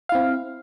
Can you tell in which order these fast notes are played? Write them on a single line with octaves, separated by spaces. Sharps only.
F5 E4 C4